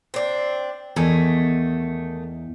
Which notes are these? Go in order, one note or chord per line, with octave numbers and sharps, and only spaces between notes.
C4 D4
E2 D#3 A3 G#5